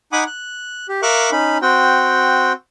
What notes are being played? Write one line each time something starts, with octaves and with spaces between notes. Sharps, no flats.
D#4 F#5 G#5 B5 D6 D#6
F#6
G4
A#4 E5 F5 C#6 D6 F#6
C#4 D#4 B5
C4 F#4 G5